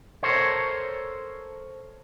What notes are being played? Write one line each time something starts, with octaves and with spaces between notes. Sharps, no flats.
A4 A#4 C5 C#5